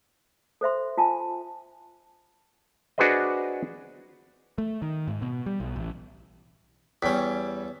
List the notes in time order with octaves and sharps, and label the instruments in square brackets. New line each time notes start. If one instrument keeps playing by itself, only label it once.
[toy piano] A4 C5 E5 C6
F4 G#5 A5
[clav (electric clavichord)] D4 F#4 G#4 B4 C5 D#5
[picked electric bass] A3
D#3
G#2
B2
G3
B1
A1
[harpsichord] E2 C#4 [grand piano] G3 G5 B6